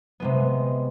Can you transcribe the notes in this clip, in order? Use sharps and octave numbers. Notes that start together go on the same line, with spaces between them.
C3 G#3 B3